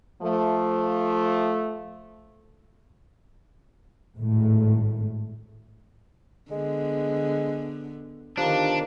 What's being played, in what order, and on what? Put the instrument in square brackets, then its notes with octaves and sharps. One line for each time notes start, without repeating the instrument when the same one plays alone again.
[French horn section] F3 A3
[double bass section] G#1 A2 A3
[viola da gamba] D3 B3 [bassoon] G#3
[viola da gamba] D3 D#3 B3 [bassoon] F3 [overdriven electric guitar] D4 [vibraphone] G4 F5 A#5